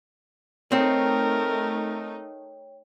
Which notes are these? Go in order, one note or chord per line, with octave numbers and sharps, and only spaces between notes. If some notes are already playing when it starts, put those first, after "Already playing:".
A3 C4 D#4 A#4 C#5 G5